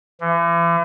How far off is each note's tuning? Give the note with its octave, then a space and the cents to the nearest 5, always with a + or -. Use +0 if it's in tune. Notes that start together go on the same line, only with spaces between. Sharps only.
E3 +40